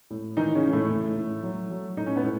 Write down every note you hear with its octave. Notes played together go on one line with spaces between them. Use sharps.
A2
D#3 E3 D#4
C#3 C#4
E3
A2 A3
A2
A2
F#3
F#3
A2 D#4
C#4
B3
A2